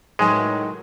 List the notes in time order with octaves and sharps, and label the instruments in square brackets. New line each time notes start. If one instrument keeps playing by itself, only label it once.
[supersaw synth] A2 F#3 [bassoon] D#3 [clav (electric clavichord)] G#3 [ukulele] B4 G#5 A5